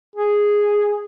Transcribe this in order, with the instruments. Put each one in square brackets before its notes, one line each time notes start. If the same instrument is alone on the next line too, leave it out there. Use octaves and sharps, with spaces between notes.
[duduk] G#4